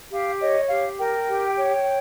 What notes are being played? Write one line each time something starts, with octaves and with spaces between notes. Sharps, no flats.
G4 F5
C#5 D#5
G4 F5
A#4 G5
G4
C#5